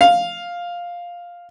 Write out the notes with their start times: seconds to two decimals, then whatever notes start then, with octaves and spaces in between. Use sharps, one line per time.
0.01 F5